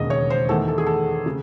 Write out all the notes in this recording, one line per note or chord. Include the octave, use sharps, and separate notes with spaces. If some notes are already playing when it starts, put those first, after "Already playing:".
Already playing: E1 D#2 C#3 G#3 D#5
C#5
C5
E2 D#3 A3 A4
A4
G#4
A4
C#3